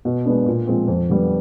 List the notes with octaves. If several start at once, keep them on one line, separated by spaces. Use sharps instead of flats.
B2
G#3 B3 D4
A#2
F3 G#3 C4
F2
D3 G3 B3